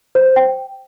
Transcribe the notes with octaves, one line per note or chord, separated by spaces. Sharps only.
C5
G5